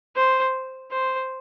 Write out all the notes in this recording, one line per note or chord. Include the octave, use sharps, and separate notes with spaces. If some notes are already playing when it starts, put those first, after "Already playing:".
C5
C5